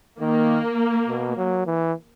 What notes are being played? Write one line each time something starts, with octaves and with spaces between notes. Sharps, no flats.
D#3 A#3
B2
F#3
E3